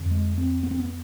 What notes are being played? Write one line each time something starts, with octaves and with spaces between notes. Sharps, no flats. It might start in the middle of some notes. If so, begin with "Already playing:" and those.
Already playing: F2 D3
G#3
C4
B3
C4
B3